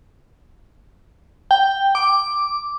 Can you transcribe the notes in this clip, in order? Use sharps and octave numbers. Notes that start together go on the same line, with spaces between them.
G5
D6